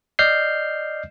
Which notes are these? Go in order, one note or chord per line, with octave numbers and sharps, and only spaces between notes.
D5 D#5 F6 G6 C7